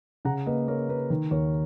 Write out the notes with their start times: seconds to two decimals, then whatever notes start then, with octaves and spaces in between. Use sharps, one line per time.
0.25 C#3 F#5 A#5
0.46 A#3 B4 D#5
0.67 A#3 A#4 C#5
0.89 A#3 B4
1.10 D#3
1.31 D#2 A#4 C#5